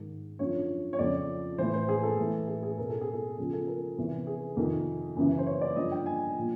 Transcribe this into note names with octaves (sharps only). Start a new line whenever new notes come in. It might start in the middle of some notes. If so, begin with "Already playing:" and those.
Already playing: G#2 D#3
F#2 D3 F3 C#5
C#5
F2 C#3 F3 D5
A2 E3 C5
C5
G#4
A4
A2 E3
G#4
G#4
E2 B2 A#4
A4
G#4
A4
E2 C#3 F3 G#4
A4
A#4
E2 C3 E3
G#4
F2 C3 D#3
F#2 C#3 E3
C5
C#5
D5
G2 D3 F3 D#5
G5
G#5
A#2 F3